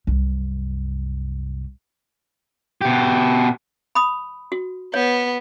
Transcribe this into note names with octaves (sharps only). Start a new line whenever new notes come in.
C2 F#2
B2 G4
B5 D#6
F#4
B3 C#5